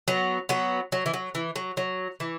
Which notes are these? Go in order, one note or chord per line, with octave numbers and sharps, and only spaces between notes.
F#3 B3
F#3 B3
F#3
E3
F#3
E3
F#3
F#3
E3